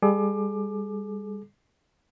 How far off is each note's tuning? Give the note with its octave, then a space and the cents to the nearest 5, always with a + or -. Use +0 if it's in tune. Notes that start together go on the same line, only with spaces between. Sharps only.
G3 +35 G#4 +45 D6 +25